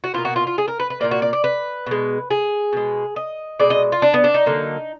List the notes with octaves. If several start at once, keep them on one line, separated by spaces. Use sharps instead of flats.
F#4
B2 A#3 F4
F#4
F4
F4
G#4
A#4
B4
B4
A#2 F3 A#3 D5
F#4
D5
D5
B4
B2 G#3
G#4
B2 G#3
D#5
B2 G#3 D5
D#5
F4
D4
B3
D4
D#4
D3 F#3 A#3